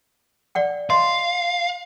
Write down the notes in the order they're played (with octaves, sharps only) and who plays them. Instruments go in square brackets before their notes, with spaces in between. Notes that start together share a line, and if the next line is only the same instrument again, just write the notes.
[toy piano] D5 F#5 G5
[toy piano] D#5 C6 [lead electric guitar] F5